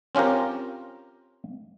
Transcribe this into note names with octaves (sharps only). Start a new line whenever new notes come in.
C4 C#4 F4 G4 A#4